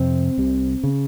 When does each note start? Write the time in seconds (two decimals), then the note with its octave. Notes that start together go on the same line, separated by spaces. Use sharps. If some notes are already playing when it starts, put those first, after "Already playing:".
Already playing: F2 C3 C4
0.38 C2 C3
0.84 C#3